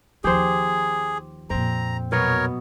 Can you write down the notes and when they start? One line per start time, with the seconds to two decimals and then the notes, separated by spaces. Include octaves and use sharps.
0.24 D#2 F3 G4 G#4 C5
1.50 F2 A#2 C4 A#5
2.12 B2 F#3 B3 A#4 C#5